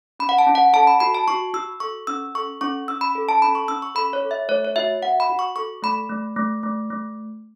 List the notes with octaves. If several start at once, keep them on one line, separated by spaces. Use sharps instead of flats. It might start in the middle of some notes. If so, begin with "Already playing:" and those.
C#4 B5
F#5
A5
C#4
F#5
A4 A5
B5
F#4 B5
A5
F#4 C#6
F#4 E6
A4 C#6
C#4 E6
A4 C#6
C#4 C#6
C#4 E6
B5
A4
A5
C#4 B5
C#6
C#4 E6
C#6
A4 B5
C#5
A4
E5
A3 C#5
C#5
F#4 E5
F#4 F#5
B5
F#4
C#6
A4 C#6
A3 B5
A3
A3
A3
A3